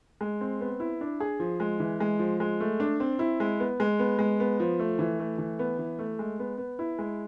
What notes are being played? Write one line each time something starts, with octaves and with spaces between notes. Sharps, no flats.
G#3
C4
B3
E4
D4
G#4
F3
G#3
E3
G#3
F3
G#3
A3
D4
C4
E4
G#3
B3
G#3
B3
G#3
B3
F3
A3
E3
A3
E3
B3
E3
A3
G#3
B3
B3
E4
G#3